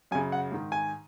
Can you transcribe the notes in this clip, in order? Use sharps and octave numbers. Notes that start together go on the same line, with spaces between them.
F#2 C#3 G#5
F#5
G#2 D#3
G#5